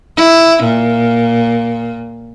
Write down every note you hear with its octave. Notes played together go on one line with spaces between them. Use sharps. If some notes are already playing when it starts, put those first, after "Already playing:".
E4
A#2